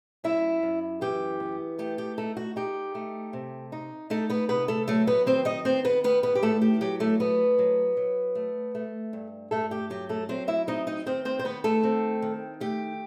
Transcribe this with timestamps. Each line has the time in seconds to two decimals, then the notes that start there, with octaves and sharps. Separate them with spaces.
0.24 F#2 E4 E5
0.63 F#2
1.01 E3 G4
1.40 B3
1.79 A3 G4
1.98 G4
2.17 A3 D#4 A4
2.37 F#4
2.56 D#4 G4
2.95 A3
3.33 C3
3.72 D#4
4.10 A3 D#4 A4
4.30 B3 B4
4.49 C3 B3 B4
4.68 A3 A4
4.88 F#3 A3 A4
5.07 B3 B4
5.26 D#3 C4 C5
5.45 D#4 D#5
5.65 B3 C4 C5
5.85 B3 B4
6.04 D#3 B3 B4
6.23 B3 B4
6.35 G4
6.42 A2 A3 A4
6.62 G4
6.81 F#3 G4
7.00 A3 A4
7.20 A3 B3 B4
7.59 F#3
7.97 F#3
8.35 A3
8.75 A3
9.13 G2
9.51 G2 A3 A4
9.71 G4
9.90 F#3 G4
10.09 A3 A4
10.29 F#3 C4 C5
10.48 E4 E5
10.67 C4 D#4 D#5
10.87 D#4 D#5
11.06 D#3 C4 C5
11.25 C4 C5
11.39 C5
11.44 D#3 B3 B4
11.64 A3 A4
11.83 C4
12.22 D#3
12.60 A3 G4